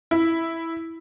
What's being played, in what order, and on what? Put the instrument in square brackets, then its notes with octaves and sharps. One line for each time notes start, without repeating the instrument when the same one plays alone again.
[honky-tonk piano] E4